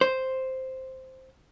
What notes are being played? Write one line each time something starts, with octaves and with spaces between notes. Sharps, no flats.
C5